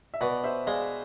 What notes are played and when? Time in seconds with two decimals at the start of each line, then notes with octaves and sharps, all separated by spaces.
0.14 E5
0.21 B2 B4 D5
0.44 C5 E5
0.67 G#3 D5 F5